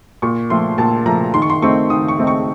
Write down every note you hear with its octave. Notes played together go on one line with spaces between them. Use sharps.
A#2 C#6
F3 A3 C6
A#2 A5
F3 A3 A#5
D#3 C6
C#6
C6
A3 C4 D#4 C#6
D#3 D#6
C#6
A3 C4 D#4
C#6